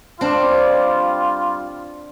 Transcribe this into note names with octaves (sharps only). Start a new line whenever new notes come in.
G3 C4 D4 F4